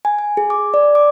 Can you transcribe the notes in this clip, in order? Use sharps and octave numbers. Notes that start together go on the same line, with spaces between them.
G#5
G#5
G#4
D6
D5
D6